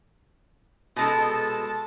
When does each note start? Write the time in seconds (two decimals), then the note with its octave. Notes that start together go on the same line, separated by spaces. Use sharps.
0.96 B2 G#3 A4 A5